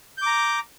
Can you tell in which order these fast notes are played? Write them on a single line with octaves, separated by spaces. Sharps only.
G6 D6 A#5